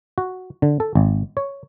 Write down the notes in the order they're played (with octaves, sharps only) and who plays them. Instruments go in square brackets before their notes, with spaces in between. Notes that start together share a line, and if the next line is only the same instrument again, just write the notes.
[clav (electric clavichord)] F#4
D3
A4
G#1
C#5